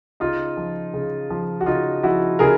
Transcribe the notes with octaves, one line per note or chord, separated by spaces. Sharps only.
C#3 D#4 F4
F3
C#3
F3
F#4
C#3 D#4 F4
F3 E4 F#4
C#3 G#4 A#4